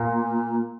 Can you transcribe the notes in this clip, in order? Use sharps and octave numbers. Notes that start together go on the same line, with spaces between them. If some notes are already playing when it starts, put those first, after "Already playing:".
Already playing: A#2